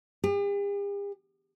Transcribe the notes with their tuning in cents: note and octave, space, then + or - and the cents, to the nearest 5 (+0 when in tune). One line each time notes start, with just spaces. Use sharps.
G4 +45